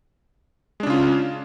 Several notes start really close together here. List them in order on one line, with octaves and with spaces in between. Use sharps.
G#3 D4 C#3 F4 C#4